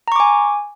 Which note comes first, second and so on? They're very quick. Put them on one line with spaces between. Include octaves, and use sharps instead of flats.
A#5 C#6 D6 G#5